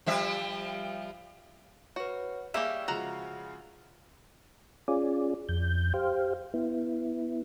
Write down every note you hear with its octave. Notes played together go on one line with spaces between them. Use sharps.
F3 G3 E5
F#4 B4 C#5
G3 A#3 G4 G#4 E5 F5 C#6
C#3 F3 G#3 F#4 A#5
C#4 F4 G#4 D5
F2 G6
G4 C5 F5
B3 E4